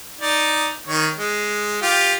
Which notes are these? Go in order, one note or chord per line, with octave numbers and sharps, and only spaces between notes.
D#4 D5
D#3 C#5
G#3
F4 G4